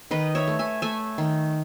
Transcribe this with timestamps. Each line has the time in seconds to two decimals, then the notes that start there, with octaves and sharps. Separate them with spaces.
0.11 D#3 B4 D#5
0.35 C#5 E5
0.48 A3
0.59 E5 G#5
0.82 A3 E5 G#5
1.18 D#3